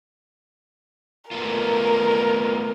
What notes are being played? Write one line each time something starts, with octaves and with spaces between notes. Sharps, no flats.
A3 B3 F4 A#4